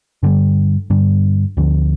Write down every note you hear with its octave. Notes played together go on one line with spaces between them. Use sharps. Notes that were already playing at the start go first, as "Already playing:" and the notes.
G2 D3 G3
G2 D3 G3
D2 D3 F3